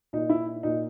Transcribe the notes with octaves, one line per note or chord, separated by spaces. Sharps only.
A#2 D#4
E4
A#2 D#4